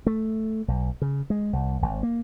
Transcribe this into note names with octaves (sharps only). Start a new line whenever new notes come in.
A3
B1
C#3
G#3
C2
G#1
A#3